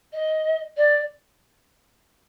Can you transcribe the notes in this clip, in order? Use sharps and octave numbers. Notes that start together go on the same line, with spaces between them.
D#5
D5